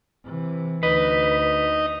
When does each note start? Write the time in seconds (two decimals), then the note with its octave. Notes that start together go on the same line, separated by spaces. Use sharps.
0.24 C3 E3
0.83 D2 D#4 B4 D#5